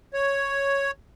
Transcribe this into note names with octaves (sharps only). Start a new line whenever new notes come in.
C#5